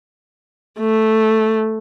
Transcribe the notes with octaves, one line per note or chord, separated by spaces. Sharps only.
A3